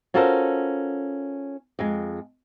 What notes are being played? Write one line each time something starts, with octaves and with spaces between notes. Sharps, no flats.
C#4 F4 F#4 A4 A#4 C5
F2 G#3